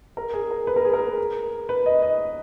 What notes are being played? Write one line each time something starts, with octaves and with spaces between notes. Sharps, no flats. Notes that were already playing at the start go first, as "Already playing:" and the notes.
A#4
G#4
A#4
B4
A#4
G#4
A#4
B4
D#5
D#5